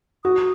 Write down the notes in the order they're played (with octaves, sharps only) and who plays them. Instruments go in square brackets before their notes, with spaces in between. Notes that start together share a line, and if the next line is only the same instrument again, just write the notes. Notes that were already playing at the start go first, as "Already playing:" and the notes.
[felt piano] F#4 [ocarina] D#6